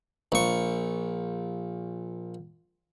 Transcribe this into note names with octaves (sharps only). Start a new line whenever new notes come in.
A#1 C#6